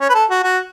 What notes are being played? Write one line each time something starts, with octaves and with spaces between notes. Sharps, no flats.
C#4
B4
A4
F#4
F#4